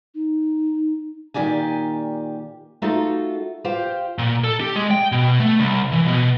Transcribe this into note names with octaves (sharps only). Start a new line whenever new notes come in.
D#4
A#2 D#3 G4 D5 G#5
A3 D#4 F4 F#4 A4
F4 G4 C5 F5 G5
A#2
A4
G4
G#3
G5
B2
A3
C2
E3
B2